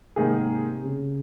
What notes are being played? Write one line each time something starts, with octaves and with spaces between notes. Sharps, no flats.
G#2 C3 D#3 A#3 D#4 G#4
C#3